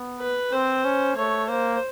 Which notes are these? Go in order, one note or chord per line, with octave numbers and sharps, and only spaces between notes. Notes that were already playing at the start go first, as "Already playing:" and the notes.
Already playing: B3
B4
C4 C5
C#4
A3 C#5
A#3 C5